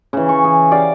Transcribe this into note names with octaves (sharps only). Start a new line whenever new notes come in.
C#3 E3
C#6
G#4
G4 D5 F5